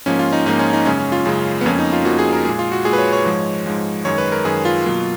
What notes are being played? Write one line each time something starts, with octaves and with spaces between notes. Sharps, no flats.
G#2 F3 A#3 C#4
F4
D#4
G#2 F3 A#3 D#4
C#4
D#4
F#2 C#3 G#3 C#4
C#4
F4
F#2 C#3 G#3
B3
F2 F3 A#3 C#4
D#4
F4
F2 F3 A#3 F#4
G#4
A#4
A#2 G#3 G#4
F4
F#4
A#2 G#3 G#4
B4
C#5
C#5
G#2 F3 G#3
G#2 F3 G#3
F#2 D#3 G#3 C#5
B4
A#4
F#2 D#3 G#3 G#4
F4
B2 F#3 A#3